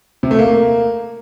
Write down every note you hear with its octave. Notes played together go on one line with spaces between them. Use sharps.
C3
A3
A#3